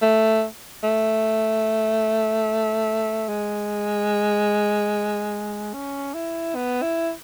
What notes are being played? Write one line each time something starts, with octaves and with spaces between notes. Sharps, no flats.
A3
A3
G#3
C#4
E4
B3
E4